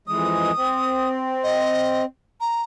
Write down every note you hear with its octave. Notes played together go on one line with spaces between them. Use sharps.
F2 E3 G#3 D#6
C4
D#5
A#5